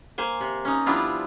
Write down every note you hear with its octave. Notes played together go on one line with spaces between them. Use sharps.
A#3 C5 G#5
C3
C#4 D#4
F3 G3 B3 D4 E4 F4